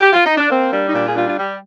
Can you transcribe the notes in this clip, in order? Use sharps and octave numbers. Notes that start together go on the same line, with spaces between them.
G4
F4
D#4
D4
A#3 C4
G3 D4
D#4
A#2 D4
F4 G#4
G3 D4 F4
D4 F4
G3